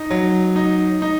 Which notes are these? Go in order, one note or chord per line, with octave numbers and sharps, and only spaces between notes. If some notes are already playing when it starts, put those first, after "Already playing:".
Already playing: D#4
F#3
D#4
D#4